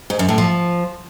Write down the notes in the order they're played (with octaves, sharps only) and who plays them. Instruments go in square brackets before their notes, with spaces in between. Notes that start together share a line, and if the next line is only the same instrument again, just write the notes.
[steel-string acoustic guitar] G#2
F#2
A2
F3